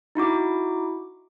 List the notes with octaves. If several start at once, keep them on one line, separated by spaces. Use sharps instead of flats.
D#4 E4 F#4 D6